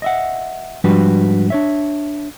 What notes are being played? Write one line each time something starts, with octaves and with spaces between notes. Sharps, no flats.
D#5 E5 F#5
G#2 F3 G3 D4 F#4 B4
D4 C#5 E5